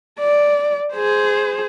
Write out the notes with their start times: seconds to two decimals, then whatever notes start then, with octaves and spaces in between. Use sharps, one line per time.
0.20 D5
0.94 G#4 C5